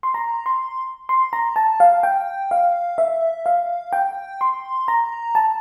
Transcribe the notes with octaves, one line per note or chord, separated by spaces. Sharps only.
C6
A#5
C6
C6
A#5
A5
F5
G5
F5
E5
F5
G5
C6
A#5
A5